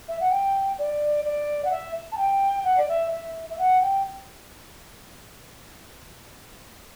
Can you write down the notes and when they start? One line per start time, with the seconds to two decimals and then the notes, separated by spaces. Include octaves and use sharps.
0.08 E5
0.20 F#5
0.30 G5
0.78 D5
1.24 D5
1.64 F#5
1.71 E5
2.12 A5
2.17 G5
2.64 F#5
2.77 D5
2.88 E5
3.12 E5
3.50 E5
3.58 F#5
3.81 G5